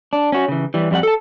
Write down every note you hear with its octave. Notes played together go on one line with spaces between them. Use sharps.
D4
C#4 F#4
C#3 E3
E3 G3
F2 G3 E4 F#5
A4 A5